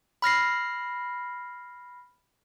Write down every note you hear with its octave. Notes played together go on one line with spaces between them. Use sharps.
B5 F6 A#6 C7